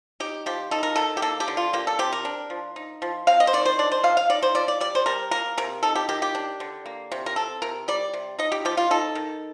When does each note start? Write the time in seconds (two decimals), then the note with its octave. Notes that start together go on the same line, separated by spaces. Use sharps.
0.20 D#4 G4
0.46 F3 G4
0.71 D#4 A4
0.83 A#4
0.96 D#3 A4
1.17 G4
1.22 A#3 A4
1.40 G4
1.48 D3
1.57 F4
1.73 A#3 G4
1.87 A4
1.99 C3 G4
2.13 A#4
2.25 D4
2.50 F3
2.76 D#4
3.02 F3
3.27 C4 F5
3.40 D#5
3.47 C5
3.53 D#3 D5
3.66 C5
3.79 D4 D5
3.92 C5
4.03 F3 F5
4.17 F5
4.30 D#4 D5
4.42 C5
4.55 F3 D5
4.68 D5
4.81 G3 D5
4.95 C5
5.06 G3 A#4
5.31 A#3 A#4
5.58 C3 A#4
5.83 D#4 A4
5.95 G4
6.09 D#3 G4
6.22 G4
6.35 D4
6.60 D3
6.86 A#3
7.12 C3
7.26 A#4
7.36 C4 A4
7.62 C3 A#4
7.88 G3 D5
8.14 C3
8.39 D#4 D#5
8.52 G4
8.65 F3 G4
8.77 F4
8.91 D#4 A4
9.15 D#3